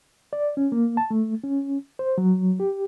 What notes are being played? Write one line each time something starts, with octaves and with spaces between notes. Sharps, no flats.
D5
C#4
A#3
A5
A3
C#4
C5
F#3
G4